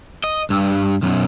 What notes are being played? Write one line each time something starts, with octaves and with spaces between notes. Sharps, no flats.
D#5
G2
B1 F#2